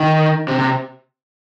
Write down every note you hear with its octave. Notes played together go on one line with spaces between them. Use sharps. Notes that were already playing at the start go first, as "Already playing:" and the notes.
Already playing: D#3
C3
C3